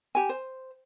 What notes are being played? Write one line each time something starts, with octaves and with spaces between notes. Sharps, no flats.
G4 G#5
C5